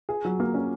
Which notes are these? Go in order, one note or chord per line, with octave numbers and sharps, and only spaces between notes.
G#4
F#3
A#3
C#4